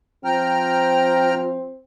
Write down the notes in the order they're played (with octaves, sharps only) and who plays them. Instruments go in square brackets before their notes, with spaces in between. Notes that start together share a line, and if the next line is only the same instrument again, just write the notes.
[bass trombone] F3 [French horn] C4 [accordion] G5 A#5 F6